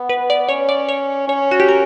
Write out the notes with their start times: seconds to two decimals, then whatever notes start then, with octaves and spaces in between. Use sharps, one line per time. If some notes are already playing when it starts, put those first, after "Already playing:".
Already playing: B3
0.09 B4
0.30 D5
0.49 C#4 C#5
0.69 D5
0.89 C#5
1.28 C#4 C#5
1.51 F#4
1.60 G4
1.68 A#4